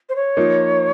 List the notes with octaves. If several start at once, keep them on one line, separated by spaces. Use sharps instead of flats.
C5
C#5
F3 A#3 D#4